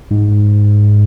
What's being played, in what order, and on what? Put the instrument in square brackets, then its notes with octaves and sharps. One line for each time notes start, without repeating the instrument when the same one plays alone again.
[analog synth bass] G#2